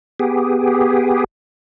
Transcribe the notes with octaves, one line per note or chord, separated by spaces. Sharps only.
B3 G4 G#4